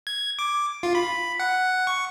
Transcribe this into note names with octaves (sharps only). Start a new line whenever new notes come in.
G#6
D6
F4
B5
F#5
C#6